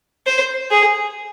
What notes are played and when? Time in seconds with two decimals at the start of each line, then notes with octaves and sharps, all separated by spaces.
0.26 C5
0.70 G#4